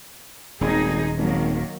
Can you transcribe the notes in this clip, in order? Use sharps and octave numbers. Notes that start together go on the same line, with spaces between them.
D#1 G#1 D#4 G#4
G#1 D#3 F#3 A#3